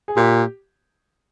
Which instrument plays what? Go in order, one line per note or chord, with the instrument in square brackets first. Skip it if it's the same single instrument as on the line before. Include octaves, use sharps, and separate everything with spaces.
[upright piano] G#4
[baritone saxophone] A#2 [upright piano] G4